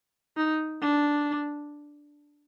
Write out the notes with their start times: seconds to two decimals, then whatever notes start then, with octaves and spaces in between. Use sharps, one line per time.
0.37 D#4
0.81 D4